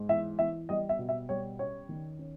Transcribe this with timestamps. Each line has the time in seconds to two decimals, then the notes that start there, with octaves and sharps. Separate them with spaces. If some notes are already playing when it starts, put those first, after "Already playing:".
Already playing: G#2
0.09 E3 E5
0.39 E3 E5
0.69 G3 D#5
0.89 E5
0.99 B2
1.09 E5
1.29 G3 C#5
1.59 C#4 C#5
1.89 D#3
2.19 C#4